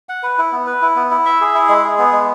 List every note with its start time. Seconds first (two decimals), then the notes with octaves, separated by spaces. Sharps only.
0.09 F#5
0.23 B4
0.38 E4
0.52 B3
0.67 B4
0.82 E4
0.96 B3
1.11 E4
1.26 E5
1.41 G#4
1.55 E4
1.69 G#3
1.84 G#4
1.99 B3
2.13 G#3